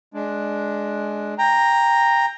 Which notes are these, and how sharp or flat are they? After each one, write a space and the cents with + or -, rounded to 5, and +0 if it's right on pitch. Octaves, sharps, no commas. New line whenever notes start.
G#3 +15 D4 +0
G5 +20 A#5 +0